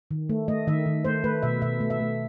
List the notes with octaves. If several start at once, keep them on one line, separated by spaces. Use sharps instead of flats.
D#3
A3
A3 D#5
D#3 E5
D#3
A3 C5
A3 B4
B2 E5
B2 E5
A3
E5
A3